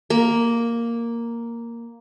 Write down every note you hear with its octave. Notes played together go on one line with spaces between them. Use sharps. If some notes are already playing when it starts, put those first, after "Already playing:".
A#3